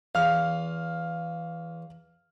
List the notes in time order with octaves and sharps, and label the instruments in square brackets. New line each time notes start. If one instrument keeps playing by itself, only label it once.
[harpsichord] E2 [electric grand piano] F5 F6